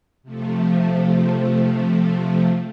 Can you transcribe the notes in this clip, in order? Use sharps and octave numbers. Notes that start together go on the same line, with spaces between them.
C3 F3 A3